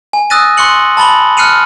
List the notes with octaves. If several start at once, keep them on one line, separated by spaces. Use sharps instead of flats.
G#5
D#6 E6 F#6 A6 A#6 D#7
C6 C#6 F#6 C#7 F#7
A5 B5 A6 F#7 G7
F6 F#6 C7 C#7 D#7 F7